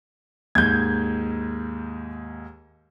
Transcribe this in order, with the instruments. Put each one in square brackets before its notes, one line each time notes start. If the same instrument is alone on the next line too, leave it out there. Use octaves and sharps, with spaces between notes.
[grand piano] D#2 G#2 [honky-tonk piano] G6 G#6